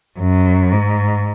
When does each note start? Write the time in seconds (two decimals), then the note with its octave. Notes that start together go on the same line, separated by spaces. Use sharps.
0.19 F#2
0.72 G#2